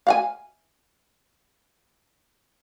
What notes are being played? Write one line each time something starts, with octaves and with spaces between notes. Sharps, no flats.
F5 F#5 G#5